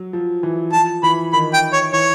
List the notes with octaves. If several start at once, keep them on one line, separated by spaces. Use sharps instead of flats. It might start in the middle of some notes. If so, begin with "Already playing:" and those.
Already playing: F#3
F3
E3
F3 A5
E3 B5
D#3 B5
G5
C#5
E3 C#5